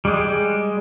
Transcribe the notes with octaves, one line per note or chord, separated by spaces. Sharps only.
G3 G#3